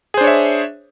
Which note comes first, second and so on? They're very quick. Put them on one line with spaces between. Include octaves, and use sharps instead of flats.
G#4 C5 D4 C#5 E5